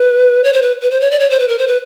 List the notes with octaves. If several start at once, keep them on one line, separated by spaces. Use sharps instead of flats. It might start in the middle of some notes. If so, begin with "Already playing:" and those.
Already playing: B4
C#5
C5
B4
B4
C5
C#5
D5
C#5
C5
B4
A#4
C5
B4